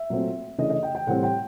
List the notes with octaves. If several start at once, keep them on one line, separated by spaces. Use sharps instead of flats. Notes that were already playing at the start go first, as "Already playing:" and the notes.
Already playing: E5
A#2 F#3 A3 C4
C#3 E3 A3 D4 D#5
D#5
G5
G5
A2 E3 G3 C4 F#5
G5